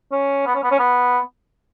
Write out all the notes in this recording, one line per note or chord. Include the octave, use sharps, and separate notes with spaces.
C#4
B3
C#4
B3
C#4
B3